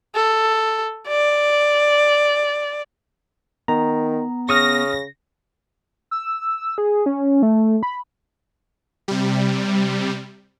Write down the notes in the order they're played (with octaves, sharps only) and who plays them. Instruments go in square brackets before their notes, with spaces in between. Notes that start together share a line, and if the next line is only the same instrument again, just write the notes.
[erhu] A4
D5
[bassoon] D#3 [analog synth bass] B3 [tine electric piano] A#5
[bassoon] C#3 [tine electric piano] C#6 D#6 F6 [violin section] A#6
[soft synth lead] E6
G#4
C#4
A3
B5
[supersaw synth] C3 G3